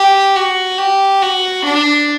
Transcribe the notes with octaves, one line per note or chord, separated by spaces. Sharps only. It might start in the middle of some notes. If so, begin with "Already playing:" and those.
Already playing: G4
F#4
G4
F#4
D4